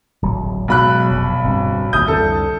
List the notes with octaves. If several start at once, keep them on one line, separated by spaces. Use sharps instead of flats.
D1 G#1 F#3
B1 F#3 G#3 B5 F#6
F1
D1 G2 C4
A1 D#2 G#2 E5 D#6 G6
C2 F2 D3 A4